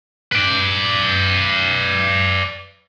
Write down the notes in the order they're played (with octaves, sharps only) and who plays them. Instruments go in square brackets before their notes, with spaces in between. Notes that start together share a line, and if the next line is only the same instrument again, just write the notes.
[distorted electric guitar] B4 D5